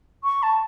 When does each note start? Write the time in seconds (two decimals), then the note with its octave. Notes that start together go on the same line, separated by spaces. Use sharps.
0.24 C#6
0.43 A5